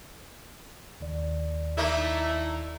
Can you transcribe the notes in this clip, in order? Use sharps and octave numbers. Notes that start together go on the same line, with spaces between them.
D#2 D#3 D5
A3 A#3 D#4 E4